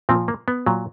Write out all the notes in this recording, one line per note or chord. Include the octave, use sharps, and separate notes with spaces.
A#2 F3 C4
A#3
B3
A#2 F#3